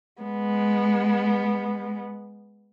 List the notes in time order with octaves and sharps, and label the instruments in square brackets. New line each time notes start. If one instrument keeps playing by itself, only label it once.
[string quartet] G#3 B3